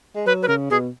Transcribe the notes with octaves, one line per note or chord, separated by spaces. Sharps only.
G#3
F#3 B4
B4
C#3 A#4
B2 G#4